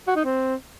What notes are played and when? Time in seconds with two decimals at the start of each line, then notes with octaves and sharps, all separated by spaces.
0.07 F#4
0.16 D#4
0.24 C4